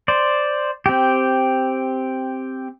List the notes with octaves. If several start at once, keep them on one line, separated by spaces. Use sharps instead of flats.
C5 D5
C4 G4